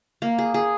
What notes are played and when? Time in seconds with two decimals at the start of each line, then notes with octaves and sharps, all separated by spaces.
0.22 A#3
0.38 G#4
0.54 G#4